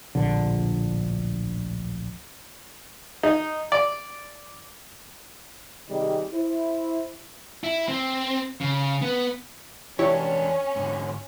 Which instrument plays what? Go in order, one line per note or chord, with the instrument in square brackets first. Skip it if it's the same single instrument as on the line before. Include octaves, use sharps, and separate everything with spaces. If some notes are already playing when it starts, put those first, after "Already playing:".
[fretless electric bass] D1 A#1 D3
[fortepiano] D#4
D5
[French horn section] C3 D#3 G3 D#4 G4 G#4
E4 C5
[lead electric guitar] E4
C4
C#3
B3
[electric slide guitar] E2 D4 [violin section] C#4 [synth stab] E4 C#5 [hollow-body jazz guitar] G4
[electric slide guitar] G#2 D3